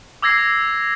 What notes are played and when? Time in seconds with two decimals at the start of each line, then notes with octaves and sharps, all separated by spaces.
0.22 D6 E6 G#6 A#6 C7